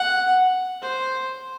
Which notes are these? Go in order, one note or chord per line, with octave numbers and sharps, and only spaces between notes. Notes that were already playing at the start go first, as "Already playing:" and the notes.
Already playing: F#5
C5